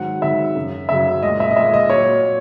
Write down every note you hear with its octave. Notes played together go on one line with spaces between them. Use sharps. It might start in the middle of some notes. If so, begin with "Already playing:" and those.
Already playing: G#2 D#3 F#3 F#5
G#2 D#3 F#3 E5
F#2 C#3 F#3
F#2 C#3 F#3 E5
A#2 G#3 D#5
E5
D#5
A#2 G#3 E5
D#5
A#2 F#3 C#5
A#2